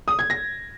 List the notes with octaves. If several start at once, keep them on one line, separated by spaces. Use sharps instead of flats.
D#6
G#6
A#6